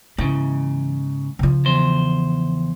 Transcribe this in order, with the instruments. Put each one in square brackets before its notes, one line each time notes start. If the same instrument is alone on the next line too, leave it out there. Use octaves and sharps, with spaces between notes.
[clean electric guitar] G#2 C#3 [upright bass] E3
[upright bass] C#3 F3
[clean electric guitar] E2 C5